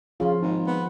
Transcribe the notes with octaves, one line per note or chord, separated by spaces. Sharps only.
C#3 F3 F4
G#1 G#2
B3